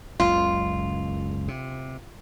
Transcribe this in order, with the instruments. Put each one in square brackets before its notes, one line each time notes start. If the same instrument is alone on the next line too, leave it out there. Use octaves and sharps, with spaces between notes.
[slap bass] F#1 C#2 F#2 [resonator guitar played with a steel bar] F4
[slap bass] C3